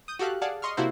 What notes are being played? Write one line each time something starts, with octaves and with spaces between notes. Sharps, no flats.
D#6 G6
F#4 G4 A4 F5 F#6
G#4 D5 F5 F#5 A5
D#5 C6 C#6 F6
C3 A#3 E4 F#4 A4 C5